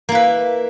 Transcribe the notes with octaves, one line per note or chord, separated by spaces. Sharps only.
A#3 E4 B4